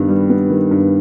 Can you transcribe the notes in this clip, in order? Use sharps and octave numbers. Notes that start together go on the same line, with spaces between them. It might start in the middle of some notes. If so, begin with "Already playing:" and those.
Already playing: G2 D#3 B3
G3
B3
D#3
G2